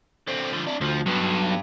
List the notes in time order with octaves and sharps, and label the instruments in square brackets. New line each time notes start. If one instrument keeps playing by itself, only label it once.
[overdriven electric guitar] D3 C4
D3 F3
D4 E4
[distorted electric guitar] D2 [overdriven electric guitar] F3
[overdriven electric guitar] G2 [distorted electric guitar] F#3 B3